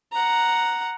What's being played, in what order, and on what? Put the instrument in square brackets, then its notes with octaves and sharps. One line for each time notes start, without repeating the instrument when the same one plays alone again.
[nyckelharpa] F#5 A#5